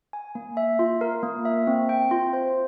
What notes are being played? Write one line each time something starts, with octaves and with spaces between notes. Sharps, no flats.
G#5
A#3
E5
F4
A#4
A#3
E5
C4
G5
F4
C5